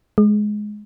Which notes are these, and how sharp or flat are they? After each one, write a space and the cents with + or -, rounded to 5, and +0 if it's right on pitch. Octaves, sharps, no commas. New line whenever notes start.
G#3 +10